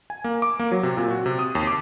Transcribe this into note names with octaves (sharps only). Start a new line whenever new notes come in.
G#5
A#3
D6
A#3
F#3
C3
A#2
F#4
C3
D#6
D#2
D6